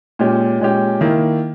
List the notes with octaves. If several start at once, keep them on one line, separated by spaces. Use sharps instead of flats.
A#2 G#3 C#4 G4
A#2 G#3 C#4 G4
D#3 A#3 E4